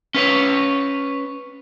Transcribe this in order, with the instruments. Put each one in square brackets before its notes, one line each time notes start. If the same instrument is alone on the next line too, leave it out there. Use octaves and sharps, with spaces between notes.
[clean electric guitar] C#4 B4 C#5